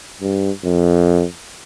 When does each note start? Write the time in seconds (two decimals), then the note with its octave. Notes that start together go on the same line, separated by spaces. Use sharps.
0.21 G2
0.64 F2